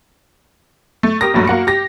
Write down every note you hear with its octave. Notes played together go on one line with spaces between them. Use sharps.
A3
G4 A#4 D#6 A#6
A#1 G2 F#3 A3
A#3 F#4 C#7
G4 A#6